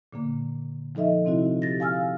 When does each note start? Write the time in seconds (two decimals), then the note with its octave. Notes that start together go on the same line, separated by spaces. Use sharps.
0.13 A#2 D3 A#3
0.95 F3 D#4 A4 D#5 E5
1.25 C3 C4 D#4 E4 F#4
1.62 G4 A6 A#6
1.80 F5 G#5 E6 F6